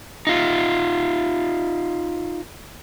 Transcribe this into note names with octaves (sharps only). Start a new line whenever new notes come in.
D#4 F4